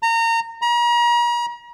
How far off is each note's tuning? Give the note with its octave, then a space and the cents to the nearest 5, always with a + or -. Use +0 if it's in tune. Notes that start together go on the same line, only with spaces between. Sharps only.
A#5 -25
A#5 +40